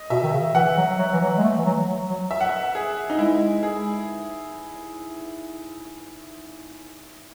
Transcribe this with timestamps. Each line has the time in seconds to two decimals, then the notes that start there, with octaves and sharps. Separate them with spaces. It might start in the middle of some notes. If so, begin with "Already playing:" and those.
Already playing: D#5
0.10 B2 E5
0.23 D#3
0.33 C#3
0.55 E3 F#5
0.77 F#3
0.98 F#3
1.13 E3
1.21 F#3
1.38 G#3
1.43 A3
1.58 E3
1.65 F#3
1.87 F#3
2.09 F#3
2.31 E5
2.41 F#5
2.49 E5
2.75 G#4
3.10 D#4
3.19 G#3 E4
3.63 G#4